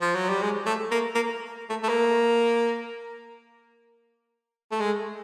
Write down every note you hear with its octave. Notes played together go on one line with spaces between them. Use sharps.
F3
F#3
G3
G#3
A3
A#3
A#3
A3
A3
A#3
A3
G#3